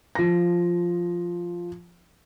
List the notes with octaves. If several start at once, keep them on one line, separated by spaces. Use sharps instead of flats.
F3 A#6